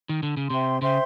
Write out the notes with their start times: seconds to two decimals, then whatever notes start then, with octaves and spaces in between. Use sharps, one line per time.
0.09 D#3
0.23 D3
0.37 C#3
0.50 C3 C5 E5 G5 C6
0.82 C#3 C5 E5 G5 C6